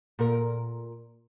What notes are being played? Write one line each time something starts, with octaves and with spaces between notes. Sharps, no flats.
A#2 A#4